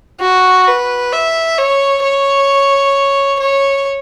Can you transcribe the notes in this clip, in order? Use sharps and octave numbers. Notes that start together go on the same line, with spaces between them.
F#4
B4
E5
C#5
C#5
C#5